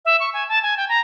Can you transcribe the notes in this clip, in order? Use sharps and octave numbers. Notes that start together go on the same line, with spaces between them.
E5
C#6
G#5
A5
G#5
G5
A#5